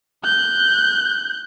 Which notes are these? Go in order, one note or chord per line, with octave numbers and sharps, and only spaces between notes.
F#6 G6